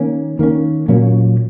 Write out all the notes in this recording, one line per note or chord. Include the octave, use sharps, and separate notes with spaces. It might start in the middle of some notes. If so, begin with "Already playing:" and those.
Already playing: D#3 A#3 C#4
D#3 A#3 C#4
A#2 F#3 A#3 C#4